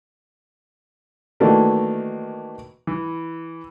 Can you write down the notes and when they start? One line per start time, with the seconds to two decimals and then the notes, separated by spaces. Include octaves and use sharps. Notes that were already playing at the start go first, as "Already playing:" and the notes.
1.40 D#3 E3 F#3 A3 A#3 D4
2.87 E3